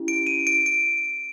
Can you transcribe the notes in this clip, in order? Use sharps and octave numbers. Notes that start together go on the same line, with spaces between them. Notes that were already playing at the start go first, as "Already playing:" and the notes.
Already playing: C#4 E4 G4
D7
D#7
D7
D7